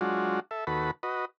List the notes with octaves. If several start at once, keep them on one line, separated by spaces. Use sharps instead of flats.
F#3 G#3 D4 F4 F#4
A4 E5
D#2 F#4 A4 B4 B5
F#4 B4 D#5